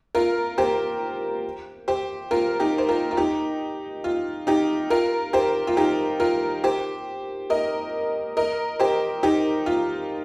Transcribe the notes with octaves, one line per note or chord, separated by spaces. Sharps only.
F4 A#4
G4 C5
G4 C5
F4 A#4
D#4 G4
C5
F4 A#4
F4
D#4 G4
F4
D#4 G4
F4 A#4
G4 C5
F4
D#4 G4
F4 A#4
G4 C5
A#4 D#5
A#4 D#5
G4 C5
D#4 G4
F4